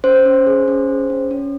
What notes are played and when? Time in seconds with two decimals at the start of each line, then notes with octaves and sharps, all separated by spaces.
0.04 C#4 C5
0.26 C#4
0.47 G#4
0.68 C#4
0.89 G#4
1.10 C#4
1.31 C#4